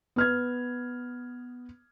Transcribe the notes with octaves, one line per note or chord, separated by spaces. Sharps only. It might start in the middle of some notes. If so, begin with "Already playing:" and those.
B3 F6 G#6